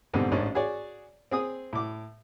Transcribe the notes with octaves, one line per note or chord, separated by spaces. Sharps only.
F2 G#2 B2 D3 G3
A1 G#2 C#4 D4
F#4 G#4 C#5 D5
C4 G#4 D#6
A2 D6